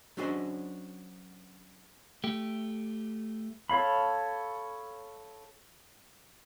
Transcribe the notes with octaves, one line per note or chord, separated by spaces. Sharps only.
F#3 C#4 D4 G#4 C5 D#5
A3 G4
A4 C#5 F5 B5